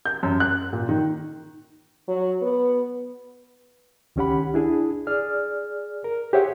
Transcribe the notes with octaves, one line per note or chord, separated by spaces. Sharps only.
G6
F#2
F#6
A#2
D#3
F#3
B3
C#2 D#3 C#4 G4 F#5 B5
D4 E4 G#4
G#4 D5 F6
A#4
G4 G#4 C5 C#5 E5 F#5